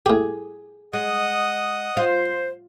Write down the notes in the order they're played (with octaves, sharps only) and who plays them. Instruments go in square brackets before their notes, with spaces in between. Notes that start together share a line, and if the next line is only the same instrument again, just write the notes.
[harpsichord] A2 G4 [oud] G#4
[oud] G#3 [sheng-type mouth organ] D#5 F#5 D#6
[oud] F4 [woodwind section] C5